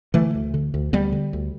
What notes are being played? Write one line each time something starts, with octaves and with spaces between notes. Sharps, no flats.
D3 E3 A3
D2
D3
D2
D2 G3 B3
D3
D2